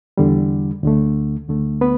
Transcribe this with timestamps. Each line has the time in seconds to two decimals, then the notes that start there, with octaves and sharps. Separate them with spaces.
0.18 E2 D3 G3
0.83 D2 D3 A3
1.49 D2 D3 A3
1.81 B3 B4